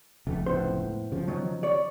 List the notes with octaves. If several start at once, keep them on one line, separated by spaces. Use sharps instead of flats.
F1 C#2 A3
A2 B3 C5
C#3 F3
D#3 F#3
C#5 D5